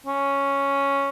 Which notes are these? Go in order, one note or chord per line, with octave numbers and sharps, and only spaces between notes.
C#4